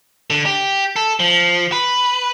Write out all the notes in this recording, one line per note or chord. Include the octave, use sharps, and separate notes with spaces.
D3
G4
A4
F3
B4